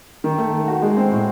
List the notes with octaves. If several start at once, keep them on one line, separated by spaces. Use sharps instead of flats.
D#3
A3
A3
F#4
G#3
C4
A2